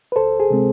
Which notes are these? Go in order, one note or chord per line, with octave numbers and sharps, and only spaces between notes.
B4
D2 A4 C5
G#4
C3 G#3 C4